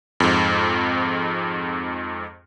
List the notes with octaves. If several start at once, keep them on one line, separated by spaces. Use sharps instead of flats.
F2 G#2